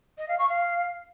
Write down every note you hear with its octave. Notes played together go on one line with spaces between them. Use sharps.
D#5
F5
C#6
F5